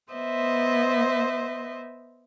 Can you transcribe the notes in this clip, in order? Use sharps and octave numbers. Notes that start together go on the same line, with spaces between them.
B3 C5 D#5 E5